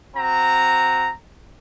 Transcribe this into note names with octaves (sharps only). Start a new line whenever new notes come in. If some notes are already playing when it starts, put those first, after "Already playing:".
C4 F#4 A#5